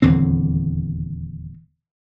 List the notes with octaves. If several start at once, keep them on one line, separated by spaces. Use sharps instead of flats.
D#1 E2 D3 C4